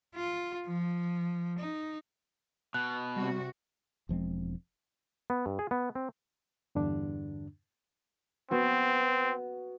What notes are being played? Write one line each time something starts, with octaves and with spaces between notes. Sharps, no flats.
F4
F3
D#4
B2 F#6
C3 G3 F#4
E1 F3 G#3 C4
B3
G2
G#4
B3
C4
E2 G2 D3 D4
B3 C4 F#4